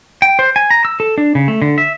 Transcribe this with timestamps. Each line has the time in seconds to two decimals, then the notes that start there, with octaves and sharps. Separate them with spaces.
0.22 G5
0.39 C5
0.56 G#5
0.71 A#5
0.85 E6
1.00 A4
1.18 D4
1.35 C#3
1.48 A3
1.62 D3
1.78 E5